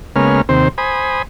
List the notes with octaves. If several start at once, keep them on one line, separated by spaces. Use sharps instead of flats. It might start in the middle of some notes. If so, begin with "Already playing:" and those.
C#3 G#3 A#3 B3 C#4 F6
D#2 C3 C4 C5
C5 G#5 B5 D#6